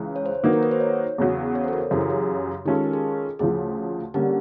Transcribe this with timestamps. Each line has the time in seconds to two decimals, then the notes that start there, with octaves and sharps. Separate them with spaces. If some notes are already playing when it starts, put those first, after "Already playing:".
Already playing: C#2 C#3 E3
0.16 C#5
0.26 C5
0.43 D#3 F#3 A#3 D#4 F#4 B4
0.53 A#4
0.63 B4
0.71 C5
0.80 C#5
1.18 E2 C#3 F#3
1.55 C#5
1.64 C5
1.68 A4
1.73 A#4
1.91 F#2 C#3 E3 G4
2.01 G#4
2.10 G4
2.65 D#3 G#3 C#4 F4 G4 A4
2.75 G#4
2.84 A#4
2.93 G#4
3.39 D2 C#3 F3 G#4
4.14 D3 G3 A#3 C#4 G4